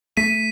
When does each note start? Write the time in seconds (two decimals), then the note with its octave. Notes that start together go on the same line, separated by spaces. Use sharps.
0.17 A3 B6 D#7